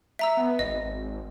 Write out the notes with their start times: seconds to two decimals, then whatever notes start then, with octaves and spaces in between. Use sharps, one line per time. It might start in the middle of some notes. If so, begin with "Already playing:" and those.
0.19 E5 A#5 E6
0.37 B3
0.59 G#1 D#5